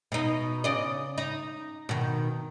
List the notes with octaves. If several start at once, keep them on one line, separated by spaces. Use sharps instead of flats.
B2 D#4
C#3 D5 D#5
D#4
B2 D#3